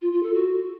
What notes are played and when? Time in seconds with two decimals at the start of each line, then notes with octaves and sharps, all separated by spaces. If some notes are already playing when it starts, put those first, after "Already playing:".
0.02 F4
0.12 F4
0.23 A4
0.34 F#4